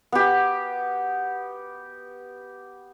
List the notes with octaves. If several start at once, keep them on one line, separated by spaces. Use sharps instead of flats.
B3 G4